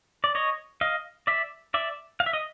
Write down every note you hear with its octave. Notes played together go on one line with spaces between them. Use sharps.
D5
C#5 D#5
D#5 F5
D5 E5
D5 E5
F5
E5
D#5